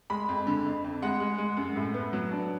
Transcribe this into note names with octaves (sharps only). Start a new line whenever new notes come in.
G#3 B5
F2
D3
F2
F2
G#3 F#5
G#3
G#3
F#2
A2
B3
F#3
D4